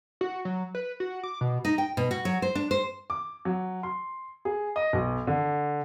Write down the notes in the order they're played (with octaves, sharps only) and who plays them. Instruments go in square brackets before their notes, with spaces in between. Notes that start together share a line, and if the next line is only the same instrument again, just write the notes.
[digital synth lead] F#4
F#3
B4
F#4
D6
B2
[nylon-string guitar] D#4
G5
B2
F#4
F#3
C5
D4
C5
[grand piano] D6
F#3
C6
G#4
D#5
B1
D3